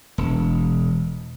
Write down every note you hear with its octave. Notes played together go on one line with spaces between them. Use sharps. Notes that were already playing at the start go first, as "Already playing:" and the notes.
E1